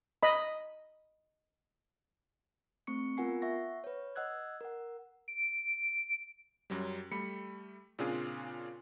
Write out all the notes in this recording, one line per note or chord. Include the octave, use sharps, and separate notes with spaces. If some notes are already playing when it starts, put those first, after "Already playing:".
D#5 B5
A3 C4 C#6 C#7
B3 F4 A#4 F#5 G#5 C7
E5 F#5 C#6 A#6
B4 C#5
D#5 F#5 E6 F#6 G#6
A#4 F#5
D7
F#2 F#3 G3
G3 A3 B5 C#7
A#2 C#3 C4 D4 F4 G#4